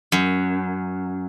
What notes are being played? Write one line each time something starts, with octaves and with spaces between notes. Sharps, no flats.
F#2